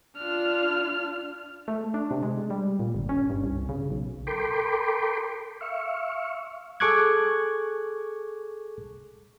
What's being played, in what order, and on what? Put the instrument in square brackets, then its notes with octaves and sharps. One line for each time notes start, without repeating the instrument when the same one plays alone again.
[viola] D4 F4 [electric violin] F6
[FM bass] A3
D4
C3
G#3
G3
A#2
G1
C#4
G2
C2
C#3
B1
[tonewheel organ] A4 A#4 G5 B5 C6 D6
E5 F5 C#6
[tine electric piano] G#4 A4 C#6 D6 F#6 G#6